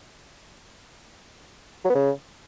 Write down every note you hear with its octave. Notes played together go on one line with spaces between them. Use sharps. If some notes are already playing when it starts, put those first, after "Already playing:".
F#3
B3
C#3